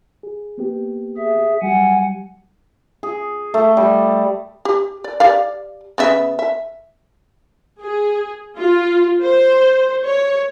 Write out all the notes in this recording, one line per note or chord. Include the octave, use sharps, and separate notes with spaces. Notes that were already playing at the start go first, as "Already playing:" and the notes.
G#4
A#3 B3 G4
G#4 E5
F#3 G3 F#5 G#5
G#4
A3
G3
G4
D5
G4 D5 F5
C#3 B3 E5
E5
G#4
F4
C5
C#5